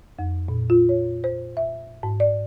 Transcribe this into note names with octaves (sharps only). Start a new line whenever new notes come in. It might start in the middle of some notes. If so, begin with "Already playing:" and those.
F2
A#2
F4
C#5
C5
E5
G#2
D5